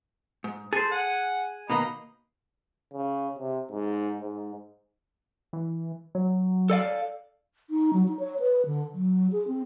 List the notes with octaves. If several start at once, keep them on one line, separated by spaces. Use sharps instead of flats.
G#2
G#4 A4 C5
F#5 G#5
B2 D#3 A#3 D#5 A#5 B5
C#3
C3
G#2
G#2
E3
F#3
A4 D5 F5
D#4
F#3
D#4
C#5
B4
D3
F#3
G#4
C4